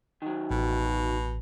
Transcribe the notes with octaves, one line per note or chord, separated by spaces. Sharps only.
D#3 F#3
A1 B2